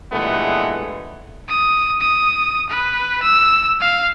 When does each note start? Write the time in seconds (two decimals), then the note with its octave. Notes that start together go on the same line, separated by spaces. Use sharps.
0.12 G2 A#2 E3 G#3 A3 B3
1.49 D#6
2.01 D#6
2.70 B4
3.23 E6
3.81 F5